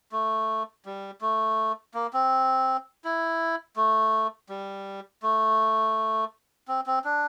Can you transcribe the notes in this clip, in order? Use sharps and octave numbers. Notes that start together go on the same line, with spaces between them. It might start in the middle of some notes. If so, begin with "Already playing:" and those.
A3
G3
A3
A#3
C4
E4
A3
G3
A3
C4
C4
D4